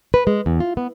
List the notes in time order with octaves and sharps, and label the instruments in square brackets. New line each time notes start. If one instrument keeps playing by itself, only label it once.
[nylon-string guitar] B4
G#3
E2
F4
B3